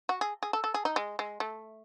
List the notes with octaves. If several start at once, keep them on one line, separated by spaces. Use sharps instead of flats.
F#4
G#4
G#4
A4
A4
G#4
D#4
G#3
G#3
A3